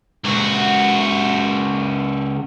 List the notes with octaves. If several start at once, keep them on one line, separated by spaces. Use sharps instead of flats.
C#2 F#4